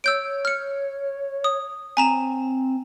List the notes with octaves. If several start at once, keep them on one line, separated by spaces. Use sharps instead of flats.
C#5 E6 G6 D7
F6 C#7
D#6
C4 G#5 A#5 E7